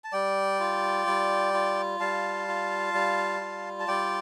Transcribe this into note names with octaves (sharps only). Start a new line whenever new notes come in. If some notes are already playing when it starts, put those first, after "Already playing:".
A5
G3 D5 G5
F4
G3
F4
G3 F5 A5
F4
G3
F4
A5
G3 D5 G5